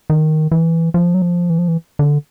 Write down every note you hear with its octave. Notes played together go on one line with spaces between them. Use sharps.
D#3
E3
F3
F#3
F3
E3
F3
E3
D3